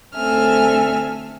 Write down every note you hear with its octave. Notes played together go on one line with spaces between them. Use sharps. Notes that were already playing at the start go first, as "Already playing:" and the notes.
D2 C4 A4 E5 G#5 F6